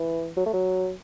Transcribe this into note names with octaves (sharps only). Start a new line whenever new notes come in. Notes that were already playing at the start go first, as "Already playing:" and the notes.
Already playing: E3
F#3
A3
F#3